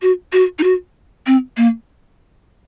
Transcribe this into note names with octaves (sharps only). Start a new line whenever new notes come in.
F#4
F#4
D#4
F#4
C4
A#3